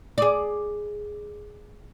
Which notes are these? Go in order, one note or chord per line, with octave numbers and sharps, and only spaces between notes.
G#4 D5